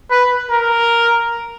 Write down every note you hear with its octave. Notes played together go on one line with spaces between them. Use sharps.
B4
A#4